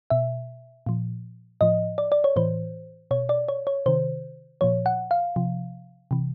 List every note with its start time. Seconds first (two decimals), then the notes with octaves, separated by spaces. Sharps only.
0.10 B2 E5
0.86 A#2 F3
1.61 A2 F3 D#5
1.98 D5
2.12 D5
2.24 C#5
2.36 A2 E3 C5
3.11 B2 C#5
3.29 D5
3.48 C#5
3.67 C#5
3.86 C3 D#3 C5
4.61 A#2 F3 C#5
4.86 F#5
5.11 F5
5.36 C3 F3
6.11 C3 E3